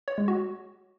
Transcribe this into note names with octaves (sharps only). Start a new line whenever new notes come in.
C#5
G#3
F#4